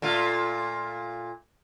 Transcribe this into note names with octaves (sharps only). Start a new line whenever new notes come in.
A#2 A3 F4